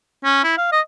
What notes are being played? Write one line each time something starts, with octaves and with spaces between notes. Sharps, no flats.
C#4
E4
F5
D#5